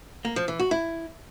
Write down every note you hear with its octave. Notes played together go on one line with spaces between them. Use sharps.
A#3
F3
E3
F#4
E4